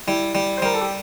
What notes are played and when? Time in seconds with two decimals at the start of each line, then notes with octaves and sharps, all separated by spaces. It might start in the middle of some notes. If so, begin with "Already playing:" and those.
0.07 G3 E4
0.35 G3
0.57 C5
0.62 G3 A#4
0.74 A4
0.81 G4